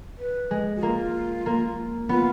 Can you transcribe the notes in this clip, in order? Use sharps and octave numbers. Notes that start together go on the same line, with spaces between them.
B4
G#3
F#4
A#3 F4
A#3
B3 F4